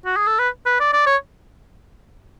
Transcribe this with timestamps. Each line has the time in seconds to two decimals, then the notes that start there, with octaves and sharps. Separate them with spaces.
0.05 F#4
0.16 G#4
0.27 A4
0.39 B4
0.66 B4
0.80 D5
0.93 D5
1.06 C#5